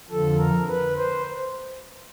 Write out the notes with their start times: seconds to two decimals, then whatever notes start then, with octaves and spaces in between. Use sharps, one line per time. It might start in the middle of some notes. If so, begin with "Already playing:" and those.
0.10 F2 D3 F3 A4
0.39 A#4
0.68 B4
0.97 C5